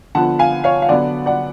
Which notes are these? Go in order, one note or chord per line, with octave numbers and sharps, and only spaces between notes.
D3 F3 B3 F#5 A5
F5 G#5
C#5 F5
F5
D3 F#3 B3 D5 F#5
D5 F#5